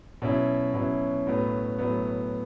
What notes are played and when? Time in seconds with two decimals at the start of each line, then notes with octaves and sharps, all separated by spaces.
0.22 B2 F#3 C#4 E4
0.74 B2 F#3 C#4 E4
1.27 A2 F#3 B3
1.79 A2 F#3 B3